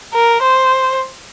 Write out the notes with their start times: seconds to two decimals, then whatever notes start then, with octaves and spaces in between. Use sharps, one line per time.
0.14 A#4
0.42 C5